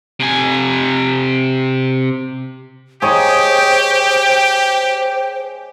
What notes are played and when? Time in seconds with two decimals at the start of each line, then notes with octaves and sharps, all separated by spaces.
0.20 C3 G#5
3.02 G4 G#4 C5 C#5 D#5 G5